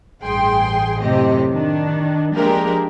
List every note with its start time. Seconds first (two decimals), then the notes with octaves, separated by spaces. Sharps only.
0.22 A1 G2 G#4 G5 C6
1.00 F#2 A2 C3 C4 G4 D#5
1.50 D#3 D4
2.33 F3 G#3 A#3 D4 G4 A#4